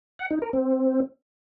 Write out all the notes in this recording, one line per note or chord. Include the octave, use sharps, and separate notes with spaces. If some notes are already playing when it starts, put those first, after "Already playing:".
F#5
D#4
A#4
C4